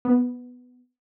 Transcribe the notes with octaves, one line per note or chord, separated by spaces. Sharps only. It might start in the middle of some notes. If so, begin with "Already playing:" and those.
B3